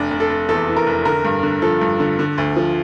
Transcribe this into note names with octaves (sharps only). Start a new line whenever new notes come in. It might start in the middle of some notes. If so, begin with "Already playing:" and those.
Already playing: F1 D4
F1
A4
F1
E2 A4
E3
A#4
F1
D3 A#4
G2
D3
F3 A4
G2
D3
D3
D2
F3